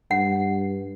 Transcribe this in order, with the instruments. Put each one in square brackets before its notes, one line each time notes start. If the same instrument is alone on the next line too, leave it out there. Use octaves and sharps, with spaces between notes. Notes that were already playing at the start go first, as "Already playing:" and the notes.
[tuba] G2 [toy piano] F#5